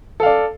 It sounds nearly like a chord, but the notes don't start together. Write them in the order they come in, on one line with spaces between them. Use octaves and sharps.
A4 F5 D5